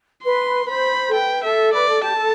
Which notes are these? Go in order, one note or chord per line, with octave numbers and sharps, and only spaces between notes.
B4 C6
B4
C5 B5
A4
B4 G5
A4 E5
B4 D5
A4
G4 A5
A4